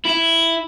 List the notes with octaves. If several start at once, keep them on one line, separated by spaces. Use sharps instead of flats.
E4